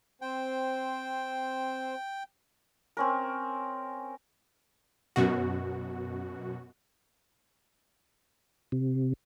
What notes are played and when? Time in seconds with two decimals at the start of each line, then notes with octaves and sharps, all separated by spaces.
0.22 C4 C5 G5
2.97 C4 C#4 A#4
5.16 F#2 B2 F#4
8.72 C3